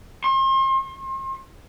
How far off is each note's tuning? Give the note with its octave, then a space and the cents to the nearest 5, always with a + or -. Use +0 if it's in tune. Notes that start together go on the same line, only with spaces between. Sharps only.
C6 +35